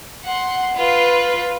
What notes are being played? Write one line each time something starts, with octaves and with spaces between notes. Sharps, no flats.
F#5 C6
F4 B4